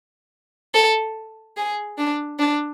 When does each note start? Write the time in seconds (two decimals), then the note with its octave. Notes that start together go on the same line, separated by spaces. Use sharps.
0.74 A4
1.57 G#4
1.98 D4
2.39 D4